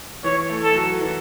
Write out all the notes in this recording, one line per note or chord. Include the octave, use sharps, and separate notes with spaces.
E3 C#5
A3
A4
F#3
E3